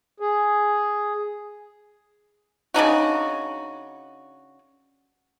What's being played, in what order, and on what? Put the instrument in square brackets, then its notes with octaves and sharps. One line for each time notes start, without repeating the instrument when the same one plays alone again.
[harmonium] G#4
[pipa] C#3 D4 D#4 F#4